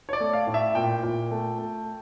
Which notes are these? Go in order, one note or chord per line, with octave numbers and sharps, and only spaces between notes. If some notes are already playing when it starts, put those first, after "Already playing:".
C#5
D5
A3
F5
A2
E5
A#2 G5
A#2
A3
A3